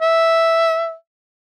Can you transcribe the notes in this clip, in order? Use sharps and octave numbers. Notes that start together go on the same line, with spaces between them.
E5